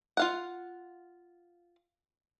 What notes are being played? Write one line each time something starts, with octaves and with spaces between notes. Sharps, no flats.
F4 F5 F#5